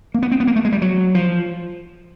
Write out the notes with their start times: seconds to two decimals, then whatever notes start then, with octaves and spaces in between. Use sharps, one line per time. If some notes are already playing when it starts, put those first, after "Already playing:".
0.14 A#3
0.22 B3
0.32 C4
0.40 B3
0.47 A#3
0.56 A3
0.65 G#3
0.72 G3
0.82 F#3
1.15 F3